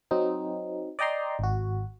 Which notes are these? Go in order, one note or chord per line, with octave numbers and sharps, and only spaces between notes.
F#3 C4 D#4
D5 D#5 G5 A#5 C6
G#1 F#4